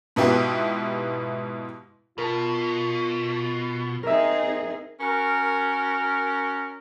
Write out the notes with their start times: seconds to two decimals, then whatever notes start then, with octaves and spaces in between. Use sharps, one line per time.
0.16 G#2 B2 B3 E4 F4 G4
2.18 B2 F4 A#4 A5
4.03 C4 D#4 G#4 A#4 E5
5.01 C#4 F#4 A#4